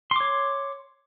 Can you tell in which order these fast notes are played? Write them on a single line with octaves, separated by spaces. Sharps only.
C6 D6 C#5